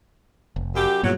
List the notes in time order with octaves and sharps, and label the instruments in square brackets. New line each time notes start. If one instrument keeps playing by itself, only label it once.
[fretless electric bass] F1
[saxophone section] F#2 G4
[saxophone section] E2 F#3 [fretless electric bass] G2 A#2